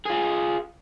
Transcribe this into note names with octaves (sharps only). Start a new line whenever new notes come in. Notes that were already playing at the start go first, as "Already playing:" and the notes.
F4 G#4